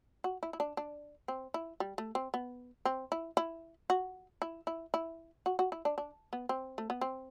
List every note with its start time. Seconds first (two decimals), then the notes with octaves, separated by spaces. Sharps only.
0.24 F#4
0.43 E4
0.53 E4
0.60 D4
0.77 D4
1.28 C4
1.54 E4
1.80 G3
1.98 A3
2.15 C4
2.34 B3
2.85 C4
3.12 E4
3.37 E4
3.90 F#4
4.42 E4
4.67 E4
4.94 E4
5.46 F#4
5.59 F#4
5.72 E4
5.85 D4
5.98 D4
6.33 B3
6.49 C4
6.78 A3
6.90 B3
7.01 C4